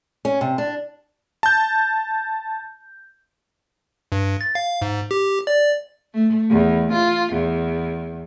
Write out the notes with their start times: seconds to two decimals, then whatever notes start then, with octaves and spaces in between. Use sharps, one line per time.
0.25 C#4
0.41 C3
0.58 D4
1.43 A5 G6
4.12 G2
4.41 A6
4.55 F5
4.82 G#2
5.11 G4
5.47 D5
6.13 A3
6.50 E2
6.93 F4
7.33 E2